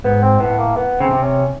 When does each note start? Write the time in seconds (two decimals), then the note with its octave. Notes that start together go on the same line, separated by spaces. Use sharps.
0.04 G#2 B3
0.22 C4
0.40 A2 B3
0.58 A#3
0.76 B3
1.00 C#3 C4
1.11 C3
1.23 C#4